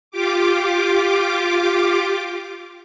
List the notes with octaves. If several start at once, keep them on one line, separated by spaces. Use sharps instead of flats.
F4 G4 D6